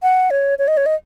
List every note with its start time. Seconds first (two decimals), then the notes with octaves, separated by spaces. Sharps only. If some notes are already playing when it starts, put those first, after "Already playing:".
0.03 F#5
0.31 C#5
0.59 C#5
0.68 D#5
0.77 C#5
0.86 D#5